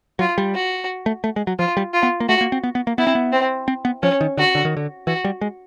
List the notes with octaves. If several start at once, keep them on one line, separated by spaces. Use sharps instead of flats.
F#3 F4
G3
F#4
A3
A3
G#3
F#3
F3 F4
G3
F4
B3
A#3
A3 F#4
A#3
C4
B3
B3
A#3
B3 E4
C4
B3
C4
C4
B3
F3 C#4
D#3
D3 F#4
D3
D#3
D3
E3 F#4
G3
G#3